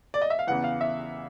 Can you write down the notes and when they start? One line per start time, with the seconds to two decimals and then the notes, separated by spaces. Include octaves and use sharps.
0.14 D5
0.22 D#5
0.30 E5
0.39 F5
0.47 E2 C#3 E3 F#5
0.64 F5
0.81 E5